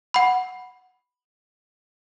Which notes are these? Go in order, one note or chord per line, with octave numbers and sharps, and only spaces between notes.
F#5 B5